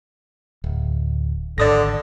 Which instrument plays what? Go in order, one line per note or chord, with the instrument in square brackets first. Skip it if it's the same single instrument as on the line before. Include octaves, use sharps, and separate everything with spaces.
[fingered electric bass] D1
[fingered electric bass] G#1 [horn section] D3 [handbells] D5 D#6 A#6